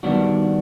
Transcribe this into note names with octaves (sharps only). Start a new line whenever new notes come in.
D#3 G3 B3 D4 F#4